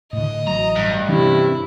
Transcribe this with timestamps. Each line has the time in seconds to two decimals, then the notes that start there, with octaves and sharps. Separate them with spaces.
0.13 A2 D3 D#5
0.47 A1 F#3 A#5
0.76 G2
1.08 C3 E3 C#4 D4 E4